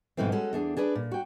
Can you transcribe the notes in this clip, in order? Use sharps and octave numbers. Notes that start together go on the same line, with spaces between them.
G#2 B2 E3 F3 A3 C4
G#3 C#4 F#4 A4
E2 D4 G#4
D4 G#4 B4 D5
A#2
F#4 G5